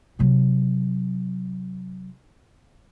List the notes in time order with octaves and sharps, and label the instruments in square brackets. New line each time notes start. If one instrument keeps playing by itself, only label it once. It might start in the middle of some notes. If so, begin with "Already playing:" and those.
[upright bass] C3 F#3